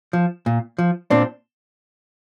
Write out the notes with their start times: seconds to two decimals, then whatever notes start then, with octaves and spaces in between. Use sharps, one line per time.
0.13 F3
0.46 A#2
0.78 F3
1.10 A#2 C4 D4